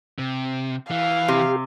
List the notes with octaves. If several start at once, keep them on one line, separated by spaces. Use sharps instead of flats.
C3
E3 F5
C3 G4